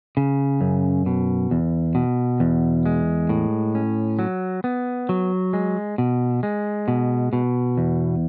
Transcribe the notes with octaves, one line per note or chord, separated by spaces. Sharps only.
C#3
F#2
B2
E2
B2
E2
G#3
A2
C#4
F#3
B3
F#3
G#3
B2
G#3
B2
B2
E2